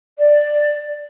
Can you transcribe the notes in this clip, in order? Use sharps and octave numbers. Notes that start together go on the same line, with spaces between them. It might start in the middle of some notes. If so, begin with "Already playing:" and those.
D5